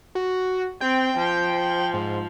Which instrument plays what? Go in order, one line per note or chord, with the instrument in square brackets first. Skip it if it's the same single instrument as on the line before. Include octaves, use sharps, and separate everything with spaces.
[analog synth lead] F#4
[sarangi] C4 [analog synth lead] G5
[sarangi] F3
[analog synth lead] G#2